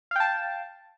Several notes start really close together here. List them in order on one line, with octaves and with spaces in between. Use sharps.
F5 G5 A5